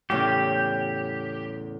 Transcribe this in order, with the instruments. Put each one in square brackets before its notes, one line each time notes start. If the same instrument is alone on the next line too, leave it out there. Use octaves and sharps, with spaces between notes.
[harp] E2 A2 C#3 [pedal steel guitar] G4